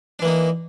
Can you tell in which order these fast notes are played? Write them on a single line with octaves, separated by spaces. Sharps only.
D4 E3 A#3 D#4